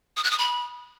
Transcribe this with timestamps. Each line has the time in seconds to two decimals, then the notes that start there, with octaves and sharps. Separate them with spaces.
0.17 D#6
0.24 F#6
0.31 D#6
0.38 B5